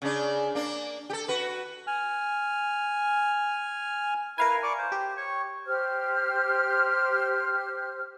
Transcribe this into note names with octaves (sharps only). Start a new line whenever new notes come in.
C#3 D4
A#3 D4
G4 A4
F#4 B4
G#5 F6
E4 A#4 B4 F5 G#5
D5 C#6 D6
C5
G4
C#5 C#6
G4 C5 F6